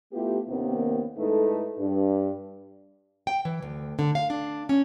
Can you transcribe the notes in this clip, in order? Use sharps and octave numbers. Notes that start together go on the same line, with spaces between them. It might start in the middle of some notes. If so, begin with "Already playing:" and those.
A3 B3 E4 F4 G4
D#2 C3 D#3 A#3 B3 C#4
G#2 A3 D#4 E4 A4 B4
G2 D4
G5
E3
D2
D3
F5
D4
C#4